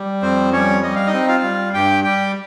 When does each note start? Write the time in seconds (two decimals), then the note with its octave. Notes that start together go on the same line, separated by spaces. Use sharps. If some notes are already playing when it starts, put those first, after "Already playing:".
Already playing: G3
0.22 F2 C4 C5
0.53 G3 C#4 C#5
0.83 G3 D#5
0.95 F5
1.07 D#4 D#5
1.13 C4
1.28 F4 F5
1.43 G3
1.74 G2 G4 G5
2.04 G3 G4 G5